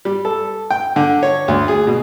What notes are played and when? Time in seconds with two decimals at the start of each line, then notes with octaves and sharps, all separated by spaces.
0.05 G3
0.25 A4
0.71 G5
0.96 D3
1.23 C#5
1.48 D2
1.68 G#4
1.87 B2